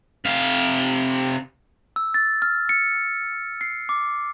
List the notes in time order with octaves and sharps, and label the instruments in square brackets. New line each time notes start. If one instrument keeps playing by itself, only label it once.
[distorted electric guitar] C3 F5
[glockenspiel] E6
A6
F6
C#7
C7
D6